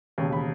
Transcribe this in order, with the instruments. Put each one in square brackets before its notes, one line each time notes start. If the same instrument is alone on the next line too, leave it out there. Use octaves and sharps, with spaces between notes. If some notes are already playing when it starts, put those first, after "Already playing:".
[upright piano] E1 D#2 C#3
B5